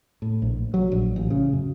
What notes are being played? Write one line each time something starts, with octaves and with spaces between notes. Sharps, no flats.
A2
A#1
F#3
A#1
A1
C#3
F#2